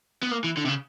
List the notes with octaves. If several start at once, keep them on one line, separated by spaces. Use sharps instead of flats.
B3
A#3
E3
D3
C3
C#3